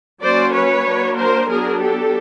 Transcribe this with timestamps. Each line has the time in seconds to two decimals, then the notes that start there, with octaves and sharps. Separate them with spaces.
0.22 F#3 A#3 C#4 C5 D5
0.54 B4 C#5
0.86 F#3 A#3 D4
1.18 A#4 C5
1.49 F#3 B3 D4 G#4 A#4
1.81 G4 A4